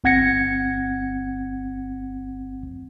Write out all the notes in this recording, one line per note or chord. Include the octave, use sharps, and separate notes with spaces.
G1 C4 F#5 G#6 A#6 C#7